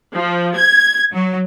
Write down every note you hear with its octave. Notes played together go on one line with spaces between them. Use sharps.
F3
G#6
F#3